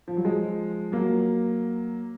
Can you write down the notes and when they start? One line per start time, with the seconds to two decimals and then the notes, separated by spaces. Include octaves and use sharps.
0.08 F3
0.17 F#3
0.25 F3 G#3
0.92 F#3 A#3